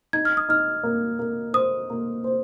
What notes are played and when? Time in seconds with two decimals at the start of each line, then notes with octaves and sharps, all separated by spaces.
0.13 D#4 G#6
0.25 F6
0.37 D#6
0.49 D#4 F6
0.83 A#3
1.19 A#3
1.54 C5 D#6
1.90 A#3
2.24 C5